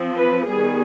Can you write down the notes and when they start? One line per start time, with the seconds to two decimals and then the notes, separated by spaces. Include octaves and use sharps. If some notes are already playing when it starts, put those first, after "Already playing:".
Already playing: F3 C4
0.17 B4
0.48 D#3 G3 B3 G#4